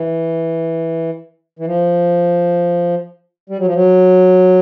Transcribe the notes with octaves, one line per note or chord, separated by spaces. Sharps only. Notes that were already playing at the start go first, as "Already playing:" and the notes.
Already playing: E3
E3
F3
G3
F#3
F3
F#3